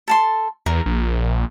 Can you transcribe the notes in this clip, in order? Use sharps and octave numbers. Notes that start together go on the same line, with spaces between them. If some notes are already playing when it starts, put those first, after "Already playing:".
A4 A5 C6
E2 A#4
A#1